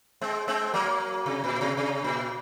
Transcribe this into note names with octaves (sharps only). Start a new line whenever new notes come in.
G#3 C4
G#3 C4
F#3 A#3
C3
A#2
C3
C3
A#2